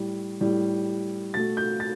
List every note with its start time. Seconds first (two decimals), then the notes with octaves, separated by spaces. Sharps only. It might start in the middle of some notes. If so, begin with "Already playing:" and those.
Already playing: A2 G3
0.41 A2 G3
1.34 B2 A3 A6
1.57 G6
1.80 A6